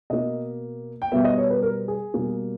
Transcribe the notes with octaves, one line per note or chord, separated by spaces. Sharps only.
B2 A#3 D#5
G5
B2 G3 B3 E5
D#5
C#5
B4
A#4
G#4
B2 G3 A#3